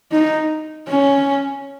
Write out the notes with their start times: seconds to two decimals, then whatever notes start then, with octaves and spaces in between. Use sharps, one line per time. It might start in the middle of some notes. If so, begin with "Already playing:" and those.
0.12 D#4
0.88 C#4